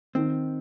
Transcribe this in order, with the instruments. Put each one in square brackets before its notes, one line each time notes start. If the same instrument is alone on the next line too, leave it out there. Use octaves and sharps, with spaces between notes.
[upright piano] D#3 [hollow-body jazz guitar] C4